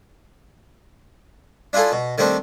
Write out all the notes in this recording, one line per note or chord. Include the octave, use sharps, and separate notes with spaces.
D4 E4 F4 G#4 A4
B2
D#3 G3 A3 C4 D4